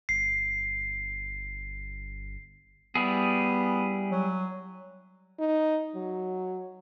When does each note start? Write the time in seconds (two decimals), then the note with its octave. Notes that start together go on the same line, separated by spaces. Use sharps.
0.09 G1 C7
2.95 G3 B3 E4 G#4
4.11 F#3
5.39 D#4
5.95 F#3